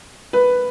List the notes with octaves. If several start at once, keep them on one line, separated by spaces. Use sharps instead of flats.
B4